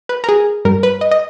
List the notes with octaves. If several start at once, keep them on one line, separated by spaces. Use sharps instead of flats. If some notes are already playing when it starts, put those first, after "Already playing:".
B4
A#4
G#4
G2 G3 A#4
B4
D#5
D#5